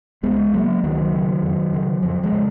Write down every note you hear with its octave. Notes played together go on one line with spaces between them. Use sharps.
C#2 G#3 B3
C#3 F#3 A#3
C#2 D#3 F#3
C#3
F2
C#3
F2 F3
F3 G#3
C#3